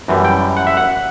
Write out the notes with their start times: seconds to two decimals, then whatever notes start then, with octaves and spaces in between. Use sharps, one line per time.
0.08 F#2 E3 G3
0.25 G5
0.57 F#5
0.67 E5
0.77 F#5